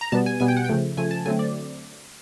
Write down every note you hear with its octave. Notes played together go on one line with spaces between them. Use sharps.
A#5
B2 G3 B3 A5
G#5
B2 G3 B3 G#5
G5
F#5
G5
C#3 F3 A3
C#3 F3 A3 G#5
A5
D3 F#3 A3 C4 G#5
D5